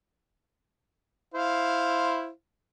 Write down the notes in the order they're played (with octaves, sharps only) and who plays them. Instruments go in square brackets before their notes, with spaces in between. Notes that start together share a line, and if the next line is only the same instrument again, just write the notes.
[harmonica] E4 C5 F5